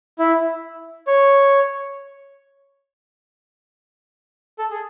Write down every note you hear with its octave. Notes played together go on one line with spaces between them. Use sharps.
E4
C#5
A4
G#4